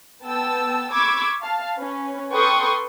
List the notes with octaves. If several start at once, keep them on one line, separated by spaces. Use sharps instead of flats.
B3 G5 A5 E6
B5 C#6 D6 E6 G#6
F5 A5
C#4 B4
A4 B4 G5 C6 C#6 D#6